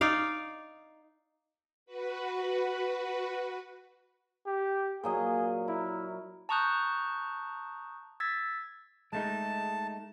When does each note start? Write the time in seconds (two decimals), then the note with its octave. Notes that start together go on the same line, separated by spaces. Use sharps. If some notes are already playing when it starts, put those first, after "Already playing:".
0.01 D#4 D5 F5
1.86 F#4 B4
4.47 G4
5.04 A#2 F#3 G#4 D#5
5.68 E4 A#4
6.49 A5 A#5 C#6 D#6 F#6 G6
8.20 E6 G#6 A6 B6
9.13 G#3 A3 D#4 A5